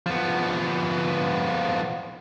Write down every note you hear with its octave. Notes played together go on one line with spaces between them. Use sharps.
F3 B3